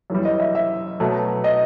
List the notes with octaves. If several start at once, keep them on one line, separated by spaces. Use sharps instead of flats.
F#2 E3 G3
D#5
E5
E5
B2 F#3 A3
D#5